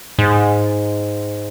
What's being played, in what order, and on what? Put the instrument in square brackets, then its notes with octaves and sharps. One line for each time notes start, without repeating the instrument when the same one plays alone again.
[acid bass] G#2